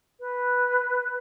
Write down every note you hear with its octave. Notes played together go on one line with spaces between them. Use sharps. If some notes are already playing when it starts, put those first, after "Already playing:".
B4